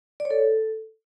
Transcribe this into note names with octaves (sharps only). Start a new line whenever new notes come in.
D5
C#5
A4